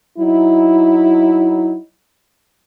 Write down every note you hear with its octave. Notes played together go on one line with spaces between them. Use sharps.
F#3 D#4 E4